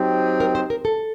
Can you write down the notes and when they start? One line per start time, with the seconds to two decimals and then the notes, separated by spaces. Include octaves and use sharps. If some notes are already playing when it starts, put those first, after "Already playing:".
Already playing: F#3 C4 D#4 G4
0.40 A#4
0.55 C5
0.70 A#4
0.85 A4